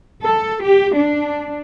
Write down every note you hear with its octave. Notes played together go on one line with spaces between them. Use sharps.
A4
G4
D4